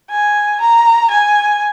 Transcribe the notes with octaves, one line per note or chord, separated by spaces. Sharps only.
G#5
A#5
G#5